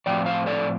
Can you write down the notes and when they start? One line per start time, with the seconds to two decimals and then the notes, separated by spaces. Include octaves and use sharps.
0.06 A2 F3 C4 F4 D5 G5
0.26 C5 F5
0.46 A4 D5